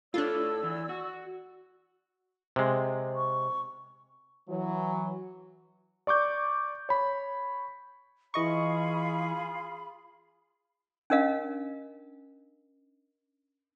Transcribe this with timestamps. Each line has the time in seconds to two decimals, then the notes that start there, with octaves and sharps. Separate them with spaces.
0.14 A2 D4 F4 A4 C#5 D5 E6
0.63 E2 E3
0.89 F#4
2.56 C3 G#3
3.16 C#6
4.49 E3 F#3
6.07 D5 C#6 D6 G6
6.89 C#5 B5
8.34 E3 F4 G#4 D#5 B5 C#6
11.10 C#4 D4 A#4 D#5 F5